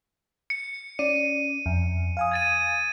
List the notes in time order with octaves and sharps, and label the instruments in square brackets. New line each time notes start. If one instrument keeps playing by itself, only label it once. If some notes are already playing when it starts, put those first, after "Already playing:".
[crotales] C#7
[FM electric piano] C#4 D5 [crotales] D#7
[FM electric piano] F2
F5 G#5 D#6
[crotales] G#6 A6 D#7